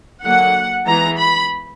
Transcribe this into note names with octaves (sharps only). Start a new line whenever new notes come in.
D3 F#3 A#3 F#5
E3 G#3 B3 A#5
B5